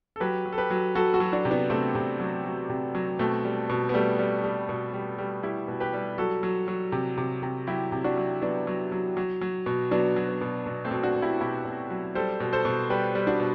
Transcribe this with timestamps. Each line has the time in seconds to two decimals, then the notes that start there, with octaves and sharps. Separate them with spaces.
0.16 A4
0.20 F#3 G4 B4
0.45 F#3
0.52 A4
0.58 G4 B4
0.70 F#3
0.95 F#3 F#4 A4
1.14 F#4 A4
1.20 F#3
1.33 D4 F#4
1.45 C3
1.51 B3 D4
1.70 C3 A3 C4
1.95 C3
2.20 F#3
2.45 F#3
2.69 C3
2.95 F#3
3.19 B2 A3 C4
3.44 G3
3.69 B2
3.89 B3
3.94 G3 A3
4.19 G3
4.44 G3
4.69 B2
4.93 G3
5.18 G3
5.43 G3 E4 G4
5.68 B2
5.80 G4 B4
5.93 G3
6.18 F#3 F#4 A4
6.43 F#3
6.68 F#3
6.92 C3
7.17 C3
7.43 C3
7.67 F#3 E4 G4
7.92 C3
8.04 D4 F#4
8.17 F#3
8.42 F#3 B3 D4
8.67 F#3
8.92 F#3
9.17 F#3
9.41 F#3
9.66 B2
9.91 F#3 B3 D4
10.16 F#3
10.29 B3
10.41 B2
10.66 B2
10.84 A3 C4
10.91 B2
11.03 D4 F#4
11.16 B2
11.22 E4 G4
11.41 B2 E4 G4
11.65 B2
11.90 F#3
12.15 G3 A4 C5
12.40 B2
12.53 A4 C5
12.65 B2
12.90 G3 G4 B4
13.15 G3
13.27 D4 F#4
13.40 B2